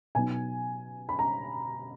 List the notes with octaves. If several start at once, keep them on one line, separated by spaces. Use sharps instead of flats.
B2 F#3 B3 D#4 G#5
B5
A#5